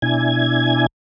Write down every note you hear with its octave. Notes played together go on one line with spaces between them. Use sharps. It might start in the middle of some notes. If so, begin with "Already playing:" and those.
B2 D4 E4 G#5 G#6